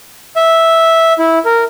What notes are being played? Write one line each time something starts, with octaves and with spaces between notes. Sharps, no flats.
E5
E4
A#4